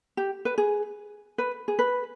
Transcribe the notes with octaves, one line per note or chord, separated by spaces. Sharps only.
G4
B4
G#4
B4
G#4
B4